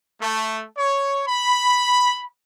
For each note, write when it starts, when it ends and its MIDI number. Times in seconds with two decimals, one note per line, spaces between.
0.22 0.64 57
0.77 1.22 73
1.28 2.27 83